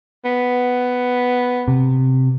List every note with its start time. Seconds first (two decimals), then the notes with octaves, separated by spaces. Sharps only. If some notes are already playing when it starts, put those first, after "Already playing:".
0.25 B3
1.68 C3